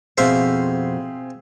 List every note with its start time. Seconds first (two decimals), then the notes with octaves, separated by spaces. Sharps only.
0.18 F2 B2 C4 G#4 C5 E5 F5